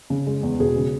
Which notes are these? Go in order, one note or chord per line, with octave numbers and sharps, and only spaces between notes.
C#3
G#3
E2
E1 G#4
C#3